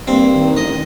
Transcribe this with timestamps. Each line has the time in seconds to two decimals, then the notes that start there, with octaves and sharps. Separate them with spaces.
0.07 G2 A#3 C4
0.34 D#3
0.57 A1 D#5